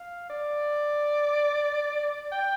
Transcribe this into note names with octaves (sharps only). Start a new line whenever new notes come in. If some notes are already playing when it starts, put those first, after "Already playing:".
Already playing: F5
D5
G5